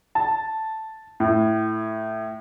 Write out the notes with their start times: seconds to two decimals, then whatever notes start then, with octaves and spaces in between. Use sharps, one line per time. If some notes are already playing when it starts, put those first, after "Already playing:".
0.15 A5
1.20 A2